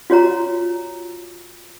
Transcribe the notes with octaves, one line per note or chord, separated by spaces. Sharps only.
F4 F#4 C#5 A#5